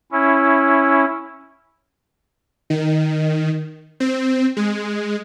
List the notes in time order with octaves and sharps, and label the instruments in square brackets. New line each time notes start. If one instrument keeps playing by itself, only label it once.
[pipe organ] C#4 E4
[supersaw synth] D#3
C4
G#3